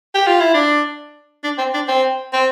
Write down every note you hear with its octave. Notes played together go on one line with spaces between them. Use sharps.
G4
F4
E4
D4
D4
C4
D4
C4
C4